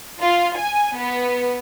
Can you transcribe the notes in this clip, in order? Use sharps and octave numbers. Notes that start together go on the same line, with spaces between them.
F4
G#5
B3